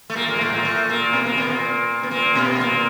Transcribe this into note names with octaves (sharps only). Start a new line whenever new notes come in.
A3
A#2 A#3
A#2 A#3
G#3
A2 A3
A#2 A#3
A2 A3
A#2 A#3
B2 B3
A#2 A#3
B2 B3
A#2 A#3
B3
A#2 A#3
B2 B3
A#2 A#3